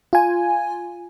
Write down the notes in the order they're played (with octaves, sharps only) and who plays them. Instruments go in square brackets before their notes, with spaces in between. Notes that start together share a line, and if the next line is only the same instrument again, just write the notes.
[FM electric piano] F4 G#5